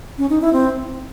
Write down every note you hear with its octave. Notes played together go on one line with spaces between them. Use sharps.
C#4
D#4
E4
C4